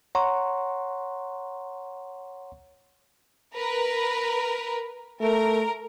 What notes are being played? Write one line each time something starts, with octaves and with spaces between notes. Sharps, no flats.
C#5 F#5 A#5 C6 C#6
A#4 B4
A3 A#4